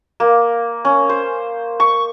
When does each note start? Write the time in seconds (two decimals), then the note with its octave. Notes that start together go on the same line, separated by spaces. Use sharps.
0.20 A#3
0.85 C#4
1.09 C5
1.80 C#6